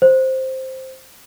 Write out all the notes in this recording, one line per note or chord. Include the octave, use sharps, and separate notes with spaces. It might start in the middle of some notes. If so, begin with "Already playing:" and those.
C5